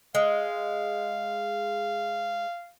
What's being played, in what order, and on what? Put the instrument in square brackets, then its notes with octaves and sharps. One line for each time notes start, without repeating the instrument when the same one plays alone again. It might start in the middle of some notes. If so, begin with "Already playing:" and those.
[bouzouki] G#3 [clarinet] F5